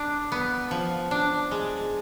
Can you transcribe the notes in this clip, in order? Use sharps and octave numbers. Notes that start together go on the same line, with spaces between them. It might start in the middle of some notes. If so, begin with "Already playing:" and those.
Already playing: D4
B3
F3
D4
G#3